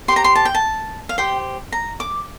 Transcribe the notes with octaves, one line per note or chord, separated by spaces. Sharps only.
G4 C5 A#5 C6
C6
A5
G5
A5
F5
G4 C5 G5
A#5
D6